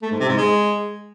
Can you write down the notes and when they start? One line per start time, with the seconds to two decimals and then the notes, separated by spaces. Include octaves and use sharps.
0.02 A3
0.11 G#2
0.20 C3
0.29 G#2
0.37 G#3